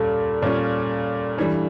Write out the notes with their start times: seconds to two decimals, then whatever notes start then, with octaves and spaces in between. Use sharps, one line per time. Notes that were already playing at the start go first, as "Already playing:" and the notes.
Already playing: A#2 G3 C#4 A4
0.42 A#2 G3 C#4 F4
1.37 G2 E3 G3